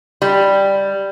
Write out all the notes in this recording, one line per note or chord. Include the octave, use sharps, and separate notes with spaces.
G3